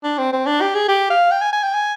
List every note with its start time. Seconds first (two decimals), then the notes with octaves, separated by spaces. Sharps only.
0.03 D4
0.18 C4
0.33 C4
0.46 D4
0.61 G4
0.75 G#4
0.88 G4
1.10 F5
1.31 G5
1.41 G#5
1.52 G#5
1.63 G5
1.74 G#5